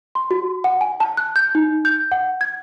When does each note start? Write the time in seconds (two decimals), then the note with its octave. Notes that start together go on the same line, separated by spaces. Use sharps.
0.15 C6
0.31 F#4
0.64 F#5
0.81 G#5
1.00 A5
1.17 F#6
1.36 G6
1.55 D#4
1.85 G6
2.12 F#5
2.41 G#6